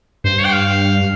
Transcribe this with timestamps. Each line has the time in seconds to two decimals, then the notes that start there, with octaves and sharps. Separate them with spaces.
0.24 G2 C5
0.39 C#5
0.45 G5
0.53 F5